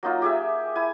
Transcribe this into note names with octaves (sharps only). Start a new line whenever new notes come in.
F#3 A#3 D#4 F4
G4 G#4 E5
E4 G#5